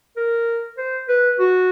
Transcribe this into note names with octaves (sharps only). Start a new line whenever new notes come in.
A#4
C5
B4
F#4